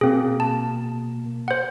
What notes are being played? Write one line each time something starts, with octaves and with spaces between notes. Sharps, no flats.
B2 A#3 C4 G#4
A5
C5 F#5